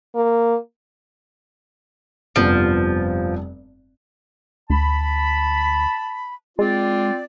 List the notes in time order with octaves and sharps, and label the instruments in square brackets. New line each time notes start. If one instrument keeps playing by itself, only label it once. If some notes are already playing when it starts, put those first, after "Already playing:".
[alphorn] A#3
[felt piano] F1 G2 B3 [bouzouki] F3
[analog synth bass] D2 [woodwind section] A5 B5
[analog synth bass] G#3 [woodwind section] C4 F4 D5